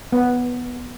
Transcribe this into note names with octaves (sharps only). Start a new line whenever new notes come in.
B3